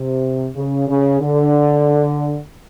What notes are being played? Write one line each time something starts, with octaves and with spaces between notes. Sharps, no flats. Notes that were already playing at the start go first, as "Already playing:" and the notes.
Already playing: C3
C#3
C#3
D3